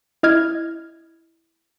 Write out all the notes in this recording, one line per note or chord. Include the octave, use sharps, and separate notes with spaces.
E4 D#5 F6 G#6